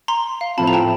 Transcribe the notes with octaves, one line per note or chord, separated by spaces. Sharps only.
A#5 C6
F5
A2 F3 A3 C4 F4 A5 B5
A#5
G5 A5